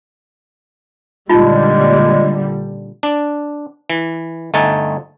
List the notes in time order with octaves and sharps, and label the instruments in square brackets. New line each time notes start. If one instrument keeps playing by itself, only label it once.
[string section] A#2 D3 G3 [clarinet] G#3 [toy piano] D#4 F4
[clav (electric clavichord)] D4
E3
G1 A3 D#4 G#5 A5